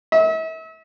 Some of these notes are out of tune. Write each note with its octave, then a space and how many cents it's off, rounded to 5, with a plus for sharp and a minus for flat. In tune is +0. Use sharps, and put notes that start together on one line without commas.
E5 -40